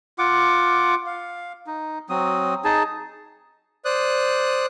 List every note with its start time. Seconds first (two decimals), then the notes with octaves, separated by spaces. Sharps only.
0.19 F4 F#5 D6
1.06 F5
1.67 D#4
2.09 F#3 C4 D#6
2.64 D#4 G#4 A5
3.85 C5 D5 D#6 F#6